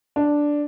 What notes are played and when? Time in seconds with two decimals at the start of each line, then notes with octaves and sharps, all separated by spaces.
0.16 D4